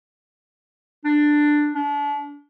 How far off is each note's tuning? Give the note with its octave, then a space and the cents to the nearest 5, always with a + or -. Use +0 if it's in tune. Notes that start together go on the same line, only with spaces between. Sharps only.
D4 +10
D4 -35